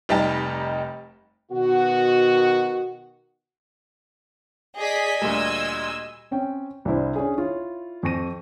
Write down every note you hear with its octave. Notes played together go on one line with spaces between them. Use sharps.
F1 G3 D#4 G4 A5
B2 D#3 F#4
G#4 D5 D#5 G#5 B6
D2 A#2 G3 E6
C4 C#4 G5
C2 D4 E4 C5
C#4 D4 G#4
E4 F4 C#5
F2 C5 C#6 A#6 D#7